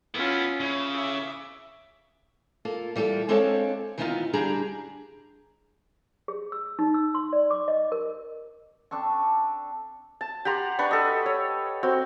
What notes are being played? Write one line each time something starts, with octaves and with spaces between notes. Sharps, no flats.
B3 C#4 E4 F4
C#3 E4
E5 D6
A#3 F4 A4
E3 G3 F4 G#4 A4
G#3 C4 D4 A4 C#5 F5
D#3 E3 B3 C4 D#4 F4
D3 G3 D4 G4 G#4 A#5
G#4
E6
D#4
E6
C6
D5
D6
D#5
A#4
C4 D4 A4 C#6
A5
G4 F#5 A#5 C6
D4 B4 C#6
A4 D#5
C#5
C4 F#4